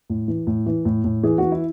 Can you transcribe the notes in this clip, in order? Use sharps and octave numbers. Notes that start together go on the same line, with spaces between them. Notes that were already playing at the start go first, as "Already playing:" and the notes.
A2
E3
A2
E3
A2
A2
E3 G#4
E3 F#4
E4